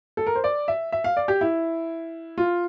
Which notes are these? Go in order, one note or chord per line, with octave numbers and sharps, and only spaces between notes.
A4
A#4
C5
D5
E5
E5
F5
D5
G4
E4
F4